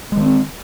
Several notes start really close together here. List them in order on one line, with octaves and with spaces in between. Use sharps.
G#3 D#3 C4